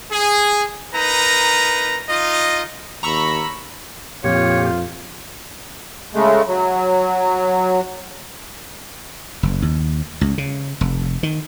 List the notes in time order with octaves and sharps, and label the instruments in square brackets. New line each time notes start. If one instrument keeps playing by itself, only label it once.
[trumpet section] G#4
D#4 A#4 B4 A#5
D#4 F4 D#5
[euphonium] D#2 [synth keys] A#5 C#6 E6 [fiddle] B5
[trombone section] F2 [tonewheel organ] A#2 G4 [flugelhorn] F4 [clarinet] C#5
[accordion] C#3 G#3 A3
F#3
[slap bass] F#1
D#2
C#2
C#3
F1
D#3